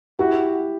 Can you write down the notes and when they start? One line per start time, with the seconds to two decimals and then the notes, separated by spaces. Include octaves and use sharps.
0.19 E4 F#4 G4